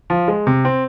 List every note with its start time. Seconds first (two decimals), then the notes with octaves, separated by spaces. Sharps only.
0.10 F3
0.28 G#3
0.47 C3
0.65 C4